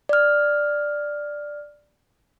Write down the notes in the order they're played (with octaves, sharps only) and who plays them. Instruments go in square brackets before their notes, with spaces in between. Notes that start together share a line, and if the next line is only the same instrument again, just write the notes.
[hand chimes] D5 F6